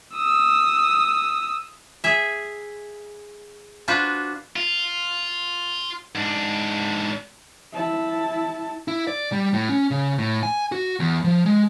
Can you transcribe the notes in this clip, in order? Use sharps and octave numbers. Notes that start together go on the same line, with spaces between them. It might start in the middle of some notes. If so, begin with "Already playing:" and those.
D#6 E6
G#4 E5
D4 F4 F#4 B4 C5
F4
G#2 D4
E4 A5
E4
D5
G3
A2
C#4
C#3
A2
G#5
F#4
E2
F3
G#3